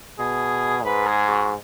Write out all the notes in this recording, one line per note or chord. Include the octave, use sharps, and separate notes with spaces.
B2 G#4
G#2 B4
G#4
F#4